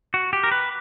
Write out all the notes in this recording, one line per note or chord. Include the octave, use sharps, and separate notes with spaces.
F#4
G4
A#4
B4